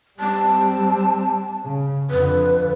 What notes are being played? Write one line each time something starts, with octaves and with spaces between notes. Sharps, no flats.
G3 C4 A5
C#3
F2 D3 B4